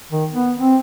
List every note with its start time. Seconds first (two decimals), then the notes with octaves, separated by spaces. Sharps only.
0.11 D#3
0.33 B3
0.60 C4